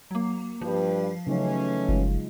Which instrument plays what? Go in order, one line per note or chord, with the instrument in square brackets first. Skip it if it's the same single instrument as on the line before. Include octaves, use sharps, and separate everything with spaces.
[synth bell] F#3 A#3
[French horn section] G2 G3 B4 [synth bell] F3
[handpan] C#3 F#3 D#4 [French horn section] E3 A3 C#4
[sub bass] F#1 [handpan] G#3 F4